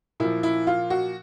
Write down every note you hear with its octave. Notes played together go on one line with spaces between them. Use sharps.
A#2 F3 E4
E4
F4
F#4